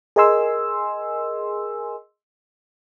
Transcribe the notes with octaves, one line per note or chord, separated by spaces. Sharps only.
G#4 A#4 D#5 G#5 C6 E6